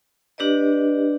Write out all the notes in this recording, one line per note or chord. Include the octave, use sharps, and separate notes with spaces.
D4 G4 B4 D5 D#5